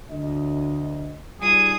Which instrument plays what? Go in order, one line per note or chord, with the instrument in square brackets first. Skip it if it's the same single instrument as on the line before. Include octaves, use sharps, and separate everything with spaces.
[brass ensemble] D2 D#5
[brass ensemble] G3 D#4 F4 [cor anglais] G#4 [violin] D#6